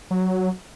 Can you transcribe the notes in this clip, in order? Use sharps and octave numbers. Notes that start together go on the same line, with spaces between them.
F#3